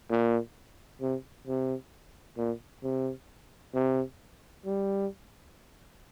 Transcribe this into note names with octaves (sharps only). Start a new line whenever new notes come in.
A#2
C3
C3
A#2
C3
C3
G3